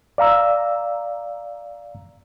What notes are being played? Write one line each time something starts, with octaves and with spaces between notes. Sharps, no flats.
D5 F5 A#5 E6